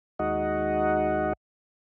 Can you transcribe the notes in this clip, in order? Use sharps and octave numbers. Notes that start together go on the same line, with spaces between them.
D#2 G#3 D#4 F#4 D#5 F#5